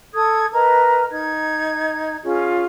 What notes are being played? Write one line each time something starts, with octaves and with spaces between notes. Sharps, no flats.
A4 D#6 G#6
A#4 B4 D#5 A#5
D#4 G#6
C#4 F4 G#4